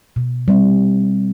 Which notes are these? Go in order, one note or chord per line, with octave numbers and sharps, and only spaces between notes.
B2
G3 C4